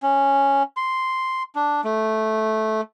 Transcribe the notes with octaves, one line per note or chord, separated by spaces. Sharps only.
C#4
C6
D4
A3